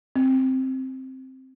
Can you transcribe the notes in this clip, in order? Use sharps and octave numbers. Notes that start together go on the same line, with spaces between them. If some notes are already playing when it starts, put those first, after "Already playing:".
C4